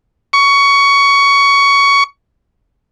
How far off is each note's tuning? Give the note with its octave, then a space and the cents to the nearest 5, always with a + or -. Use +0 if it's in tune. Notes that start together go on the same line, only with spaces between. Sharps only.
C#6 +15